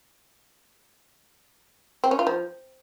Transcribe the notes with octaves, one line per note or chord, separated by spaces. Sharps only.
C4
C#4
F4
F3